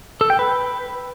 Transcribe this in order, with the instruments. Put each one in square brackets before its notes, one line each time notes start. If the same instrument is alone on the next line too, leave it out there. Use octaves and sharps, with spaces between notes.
[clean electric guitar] A4
G5
B4